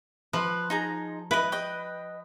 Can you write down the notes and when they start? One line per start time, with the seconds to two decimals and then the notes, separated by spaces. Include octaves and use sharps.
0.33 F3 B4
0.70 D#4 G#4 A#5
1.31 E4 B4 D#5
1.52 D#5 G5